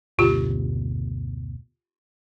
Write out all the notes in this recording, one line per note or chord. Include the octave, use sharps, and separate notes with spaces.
F#1 D2 B2 F4 G4